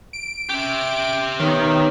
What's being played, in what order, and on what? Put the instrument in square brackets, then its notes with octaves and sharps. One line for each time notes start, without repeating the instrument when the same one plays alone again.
[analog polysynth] D7
[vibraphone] C#4 [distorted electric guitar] G4 E5
[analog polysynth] D#3 [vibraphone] B3 B4 C#5